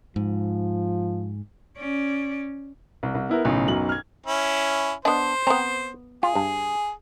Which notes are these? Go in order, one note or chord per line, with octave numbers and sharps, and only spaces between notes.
G#2 F3
C#4 D5
C2
C2
B3 E4 A#4
B1 A2 C#3
B1 F#2 F#7
F6 G#6
C#4 E4
B3 D4 C5 D#5
B3 C4 A#5
F4 G#4
G2